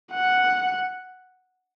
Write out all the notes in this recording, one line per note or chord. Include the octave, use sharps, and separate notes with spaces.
F#5